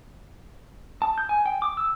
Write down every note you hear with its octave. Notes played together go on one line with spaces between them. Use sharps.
A5
G6
G#5
G5
D6
E6